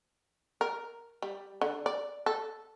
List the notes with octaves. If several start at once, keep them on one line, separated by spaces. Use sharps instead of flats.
A#4
G3
D3
D5
A4